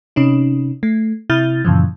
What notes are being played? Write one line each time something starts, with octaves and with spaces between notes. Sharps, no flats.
C3 C#4 D#4
A3
C3 E4 F6 G6 A6
F#2 A#2 C#3 E3 F3